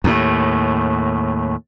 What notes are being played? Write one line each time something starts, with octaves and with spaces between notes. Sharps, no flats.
D#2 A2